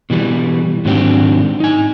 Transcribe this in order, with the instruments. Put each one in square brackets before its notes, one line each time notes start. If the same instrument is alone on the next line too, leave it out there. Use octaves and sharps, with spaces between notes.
[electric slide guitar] B2 E3 G3
G#2 D#3 F#3 C4 D4 G4
D#4 G#5